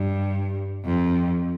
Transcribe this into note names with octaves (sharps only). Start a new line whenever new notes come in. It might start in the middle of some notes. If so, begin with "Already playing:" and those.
Already playing: G2
F2